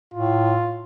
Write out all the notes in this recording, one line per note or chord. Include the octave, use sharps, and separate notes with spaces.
A2 F4